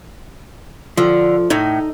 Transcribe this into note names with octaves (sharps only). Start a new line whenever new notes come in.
D3 F3
A2 D#4